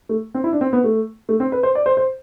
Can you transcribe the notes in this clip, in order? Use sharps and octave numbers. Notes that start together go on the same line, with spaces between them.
A3
C4
E4
D4
C4
B3
A3
A3
C4
B4
C5
D5
C5
C5